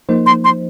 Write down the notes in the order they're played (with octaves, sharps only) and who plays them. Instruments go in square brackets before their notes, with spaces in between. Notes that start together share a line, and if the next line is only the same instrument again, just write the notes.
[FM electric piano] F3 A#3 D#4 C5
[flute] C6
C6